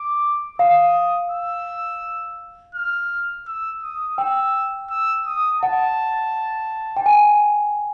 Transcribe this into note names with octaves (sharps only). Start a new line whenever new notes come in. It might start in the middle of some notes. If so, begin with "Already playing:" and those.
Already playing: D6
F5 D#6
E6
F6
E6
D#6
G5 E6
E6
D#6
F#5 A5
G5
G#5